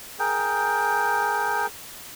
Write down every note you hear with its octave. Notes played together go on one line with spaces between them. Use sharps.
G#4 A#4 G5